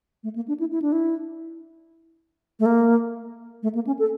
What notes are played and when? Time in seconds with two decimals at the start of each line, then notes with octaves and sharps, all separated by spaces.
0.24 A3
0.36 A#3
0.48 D4
0.60 E4
0.71 E4
0.82 D4
0.92 E4
2.60 A3
2.66 A#3
3.63 A3
3.75 A#3
3.87 C#4
3.99 A4